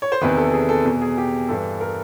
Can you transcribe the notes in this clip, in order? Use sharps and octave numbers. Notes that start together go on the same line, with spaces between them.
C#5
C5
E2 C3 D#3 B4
A4
G#4
A4
E2 B2
G#4
G4
G2 E3 A4
A#4